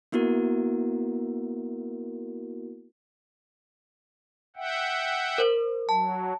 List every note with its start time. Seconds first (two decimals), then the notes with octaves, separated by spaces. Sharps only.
0.12 A#3 B3 E4 F#4 A#4
4.56 E5 F#5 G5
5.38 A#4 C5
5.89 F#3 A5